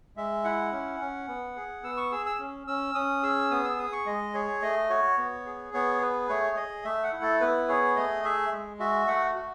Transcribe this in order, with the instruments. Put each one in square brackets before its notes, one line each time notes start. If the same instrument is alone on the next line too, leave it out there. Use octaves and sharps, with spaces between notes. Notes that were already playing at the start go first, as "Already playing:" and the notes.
[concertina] G#3 E5
E4 F#5
C#4
C#4
B3
G#4
B3 E6
C#6
G#4 E6
E6
C#4
C#4 E6
C#4 D#6
G#4 E6
B3 D#6
E6
G#4 D#6
C#6
G#3 D#5
G#4 C#5
A3 D#5
F#4 C#5
B3
G#4
B3 C#5
G#4 B4
A3 C#5
G#4 D#5
A3 E5
F#5
E4
A4
B3 B4
G#4 C#5
A3 D#5
G#4 E5
G#3
F#4 E5
A3 F#5
F#4